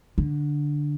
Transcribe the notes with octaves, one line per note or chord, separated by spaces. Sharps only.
D3